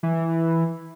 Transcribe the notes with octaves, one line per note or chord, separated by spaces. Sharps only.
E3